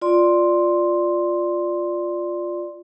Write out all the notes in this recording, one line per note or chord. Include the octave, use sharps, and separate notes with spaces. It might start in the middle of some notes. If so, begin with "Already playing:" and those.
F4 D5 C6